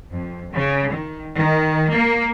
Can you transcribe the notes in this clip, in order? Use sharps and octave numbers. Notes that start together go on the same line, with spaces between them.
F2
C#3
D#3
D#3
A#3